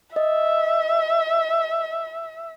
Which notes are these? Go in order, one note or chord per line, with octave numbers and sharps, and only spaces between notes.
D#5 E5